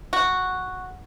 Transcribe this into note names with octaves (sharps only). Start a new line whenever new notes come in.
F#4